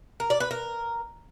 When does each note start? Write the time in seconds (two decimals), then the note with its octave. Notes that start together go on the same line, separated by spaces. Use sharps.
0.20 A#4
0.30 D5
0.40 B4
0.51 A#4